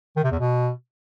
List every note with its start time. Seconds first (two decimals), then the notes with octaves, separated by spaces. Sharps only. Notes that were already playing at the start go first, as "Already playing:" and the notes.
0.16 D#3
0.24 C3
0.32 E2
0.39 B2